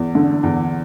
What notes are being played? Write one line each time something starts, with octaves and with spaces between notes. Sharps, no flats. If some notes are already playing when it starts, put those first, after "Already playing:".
Already playing: E2
D3
E2